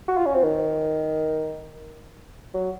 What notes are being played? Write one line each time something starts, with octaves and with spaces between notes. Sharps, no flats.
F#4
F4
C#4
C4
D#3
F#3